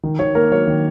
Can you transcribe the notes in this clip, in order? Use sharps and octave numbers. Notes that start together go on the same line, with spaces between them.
D#3
D#3 C#5
A#3 A#4
F#3 C#5
D#3